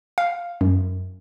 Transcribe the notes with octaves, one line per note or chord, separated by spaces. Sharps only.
F5
F#2